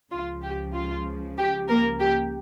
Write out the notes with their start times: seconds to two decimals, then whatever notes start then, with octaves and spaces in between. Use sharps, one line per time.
0.11 C#2 C#3 F3 F4
0.43 G4
0.75 F4
1.38 G4
1.69 A#3 A#4
2.00 G4